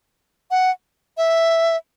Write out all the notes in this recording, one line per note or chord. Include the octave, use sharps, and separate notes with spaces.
F#5
E5